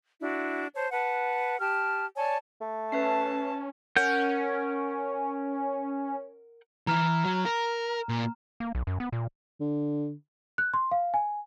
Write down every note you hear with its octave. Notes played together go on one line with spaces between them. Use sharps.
D4 E4 F#4
C5 C#5 A5
B4 F#5 A5
G4 A5 F6
C#5 D5 G#5 A5
A3
C#4 B4 E5 A5 C7
C#4 A#4 F#5 G6
E3 E4 A#5 F6 E7
F#3
A#4
A#2
A#3
B1
F#2
B3
A#2
D3
F#6
C6
F5
G#5